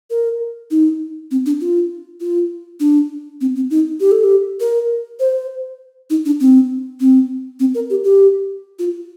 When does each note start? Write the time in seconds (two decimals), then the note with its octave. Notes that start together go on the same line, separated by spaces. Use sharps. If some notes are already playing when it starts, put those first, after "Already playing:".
0.10 A#4
0.71 D#4
1.31 C4
1.46 D4
1.61 F4
2.20 F4
2.80 D4
3.41 C4
3.56 C4
3.70 D#4
4.00 G4
4.11 A4
4.24 G4
4.60 A#4
5.20 C5
6.10 D#4
6.25 D4
6.41 C4
7.00 C4
7.60 C4
7.75 A#4
7.90 G4
8.04 G4
8.79 F4